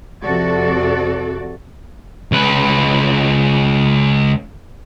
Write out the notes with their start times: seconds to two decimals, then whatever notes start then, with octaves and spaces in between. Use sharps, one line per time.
0.23 F2 C3 F3 F#4 A4 D5
2.32 C#2 B4